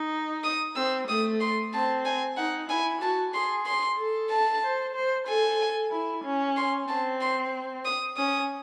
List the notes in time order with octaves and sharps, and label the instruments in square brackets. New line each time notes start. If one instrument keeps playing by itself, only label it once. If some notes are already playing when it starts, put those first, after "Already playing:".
Already playing: [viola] D#4
[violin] D#6
[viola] C4 [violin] E6
[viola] A3 [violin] D#6
[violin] C6
[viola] C4 [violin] A5
[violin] G#5
[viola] D#4 [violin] F#5
[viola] E4 [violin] G#5
[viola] F#4 [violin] A5
[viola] G#4 [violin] C6
[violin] C6
[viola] A4
[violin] A5
[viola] C5
C5
[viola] A4 [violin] G#5
[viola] E4
C#4
[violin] C6
[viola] C4 [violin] A5
[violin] C6
D#6
[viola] C#4 [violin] D#6